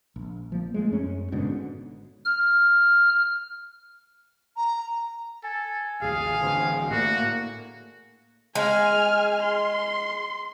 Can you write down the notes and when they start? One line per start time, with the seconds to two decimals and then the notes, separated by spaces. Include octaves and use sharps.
0.16 A#1
0.52 F3 A#3
0.74 G#3 A3
0.91 F#2 C#4
1.32 G#1 G#2 B2 D3
2.25 F6
4.56 A#5
5.44 A4 G#5
6.02 A1 D#2 G#4 F5
6.41 A1 B2 D3 F3
6.91 A2 D3 A#3 F#4
8.55 G#3 G#5 F6
9.42 C6